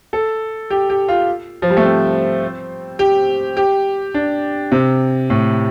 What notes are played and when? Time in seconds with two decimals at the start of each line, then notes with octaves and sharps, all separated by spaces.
0.13 A4
0.70 G4
0.90 G4
1.08 F4
1.62 F3
1.70 G3
1.77 A3
1.85 C4
2.99 G4
3.57 G4
4.14 D4
4.72 C3
5.30 A2